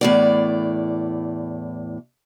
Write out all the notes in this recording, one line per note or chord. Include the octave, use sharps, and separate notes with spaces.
E2 A2 D5